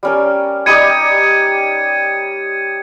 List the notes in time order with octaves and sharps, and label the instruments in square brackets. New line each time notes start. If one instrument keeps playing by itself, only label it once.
[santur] G3 C#4 A#4
[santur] G3 D#4 G4 [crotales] G#6 C#7 D#7